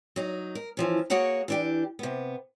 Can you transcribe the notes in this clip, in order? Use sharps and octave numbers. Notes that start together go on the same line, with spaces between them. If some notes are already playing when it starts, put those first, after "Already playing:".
F#3 D#4
A#4
E3 F3 C#4
A#3 F#4 G#4 C#5 F#5 A#5
E3 D4 G4
C3 B3